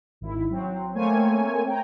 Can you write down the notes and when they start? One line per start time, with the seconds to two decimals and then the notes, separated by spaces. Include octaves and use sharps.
0.21 G#1 E4
0.50 F#3 C4
0.95 A3 A#3 C4 C#5 G#5
1.67 G5 A#5